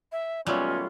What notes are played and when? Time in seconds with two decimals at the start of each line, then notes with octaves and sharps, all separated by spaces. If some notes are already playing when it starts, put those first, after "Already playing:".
0.12 E5
0.46 D#2 B2 F#3 G3 A3 C#4 F4